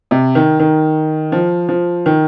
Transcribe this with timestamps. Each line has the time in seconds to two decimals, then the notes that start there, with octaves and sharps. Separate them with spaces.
0.11 C3
0.35 D#3
0.60 D#3
1.32 F3
1.69 F3
2.06 D#3